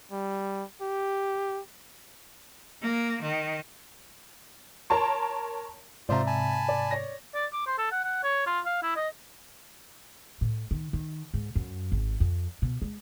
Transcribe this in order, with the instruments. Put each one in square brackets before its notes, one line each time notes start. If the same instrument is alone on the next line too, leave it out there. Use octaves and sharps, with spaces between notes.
[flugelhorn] G3
G4
[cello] A#3
D#3
[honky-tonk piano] A#4 C#5 A5 C6
[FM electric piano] G#2 C3 [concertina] F4 C5 [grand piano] D5 E5 A#5
[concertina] G#5 A5 B5
[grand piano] D5
C#5 D5 A#6
[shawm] D5
D6
C5
A4
F#5
F#5
C#5
F4
F5
E4
D#5
[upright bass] A2
D#3
D#3
G#2
F#2
G#1
F2
B2
G#3